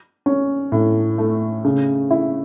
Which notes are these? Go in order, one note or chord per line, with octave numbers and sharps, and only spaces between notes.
C#4
A2
A3
C#3
E4